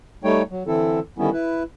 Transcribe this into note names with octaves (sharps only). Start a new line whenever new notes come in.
G3 A3 D#4 C#5 G5
F#3
D3 E3 C4 E4 A4
D3 D#3 G3 B3 C#4 E4
E4 B4